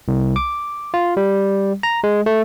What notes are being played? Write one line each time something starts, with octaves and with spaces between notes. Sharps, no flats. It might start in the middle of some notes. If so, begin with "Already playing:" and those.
C2
D6
F4
G3
A#5
G#3
A3